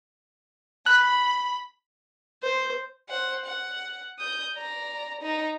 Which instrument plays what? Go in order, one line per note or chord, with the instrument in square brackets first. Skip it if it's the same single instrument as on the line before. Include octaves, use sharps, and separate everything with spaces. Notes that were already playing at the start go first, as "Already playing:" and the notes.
[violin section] B5 [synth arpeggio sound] F#6
[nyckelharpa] C5
[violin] C5 F#5
F#5
D#6 G6
D5 A#5
D#4 A#5